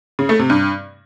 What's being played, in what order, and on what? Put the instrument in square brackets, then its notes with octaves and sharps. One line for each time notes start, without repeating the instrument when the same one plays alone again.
[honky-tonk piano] C#3
A3
C3
G2